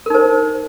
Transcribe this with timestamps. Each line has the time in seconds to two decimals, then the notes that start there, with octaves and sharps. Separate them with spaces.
0.06 A#4
0.10 D#4
0.14 C5